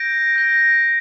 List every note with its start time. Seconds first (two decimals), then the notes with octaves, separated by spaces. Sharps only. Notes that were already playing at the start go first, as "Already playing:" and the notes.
Already playing: G6 A#6 D7
0.36 G6 A#6 D7